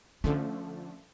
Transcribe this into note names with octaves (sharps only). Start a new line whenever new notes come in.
D3 F3 A3 C#4